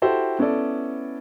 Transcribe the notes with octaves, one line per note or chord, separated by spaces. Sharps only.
E4 F#4 G4 A4 C5
B3 C#4 E4 A4 D5